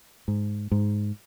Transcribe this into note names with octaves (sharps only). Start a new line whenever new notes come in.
G#2
G#2